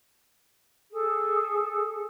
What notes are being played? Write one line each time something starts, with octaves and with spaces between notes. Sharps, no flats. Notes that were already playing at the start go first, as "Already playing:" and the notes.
G#4 A4